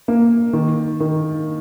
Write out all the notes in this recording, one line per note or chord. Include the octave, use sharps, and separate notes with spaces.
A#3
D#3
D#3